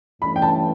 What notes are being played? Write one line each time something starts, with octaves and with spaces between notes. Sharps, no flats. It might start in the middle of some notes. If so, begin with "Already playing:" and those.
G2 E3 A3 C#4 B5
G5
A5